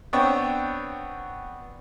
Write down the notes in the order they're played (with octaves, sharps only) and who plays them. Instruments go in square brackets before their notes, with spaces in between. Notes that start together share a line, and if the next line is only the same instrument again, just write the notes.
[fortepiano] B3 C4 D4 C#5 G5